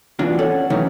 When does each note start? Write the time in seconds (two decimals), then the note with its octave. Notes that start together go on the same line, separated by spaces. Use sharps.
0.19 E3 D4 F4 F#4
0.39 C#4 A4 F#5
0.70 D#3 E3 F#3 A3 C#4 D#4